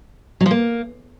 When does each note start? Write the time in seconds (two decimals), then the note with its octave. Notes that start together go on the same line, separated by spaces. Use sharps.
0.41 F#3
0.46 F3
0.51 A#3